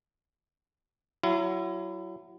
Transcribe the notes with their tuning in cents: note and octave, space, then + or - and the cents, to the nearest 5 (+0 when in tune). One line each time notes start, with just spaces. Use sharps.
F#3 +15 E4 +30